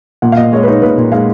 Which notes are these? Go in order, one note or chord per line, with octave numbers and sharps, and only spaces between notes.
A#2 F#5
F5
A#2 D#5
G#3 C#5
B4
D#4 C#5
A#2 B4
A#2
G#3 F5